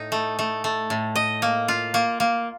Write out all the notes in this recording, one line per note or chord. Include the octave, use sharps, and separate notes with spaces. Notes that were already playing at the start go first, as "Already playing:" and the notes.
Already playing: A2 D#4
A3
A3
A3
A2
D#5
A#3
F4
A#3
A#3